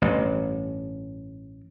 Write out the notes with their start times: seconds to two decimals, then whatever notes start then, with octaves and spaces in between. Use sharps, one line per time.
0.02 A1 G2